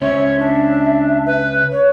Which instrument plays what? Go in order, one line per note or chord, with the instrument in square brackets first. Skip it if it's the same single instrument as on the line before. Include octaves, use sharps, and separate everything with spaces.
[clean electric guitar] C#2 C#4 C5 [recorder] C#5 [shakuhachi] E5
[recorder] D4
B4
[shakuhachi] C#5